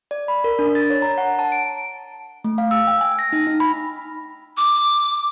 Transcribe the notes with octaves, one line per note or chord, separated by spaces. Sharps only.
D5
B5
A#4
D4
A6
C#5
A#5
F#5
A5
D7
A3
F5
E6
G5
G#5
A#6
D#4
D#4
B5
D6